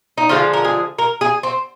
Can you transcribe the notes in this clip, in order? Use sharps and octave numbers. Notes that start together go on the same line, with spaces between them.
D#4
D3 F3 G#3 F4
A#4
G#4
A#4
G#4
C4